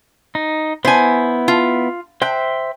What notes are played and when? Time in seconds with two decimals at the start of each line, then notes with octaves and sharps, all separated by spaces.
0.35 D#4
0.85 B3 E4 C5 G#5
1.48 F4
2.22 C5 E5 G5 F#6